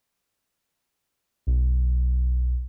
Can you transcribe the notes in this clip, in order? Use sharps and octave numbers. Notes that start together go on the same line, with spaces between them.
B1